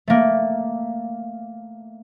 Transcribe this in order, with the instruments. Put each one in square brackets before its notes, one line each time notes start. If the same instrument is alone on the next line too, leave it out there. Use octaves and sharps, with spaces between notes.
[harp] A3 A#3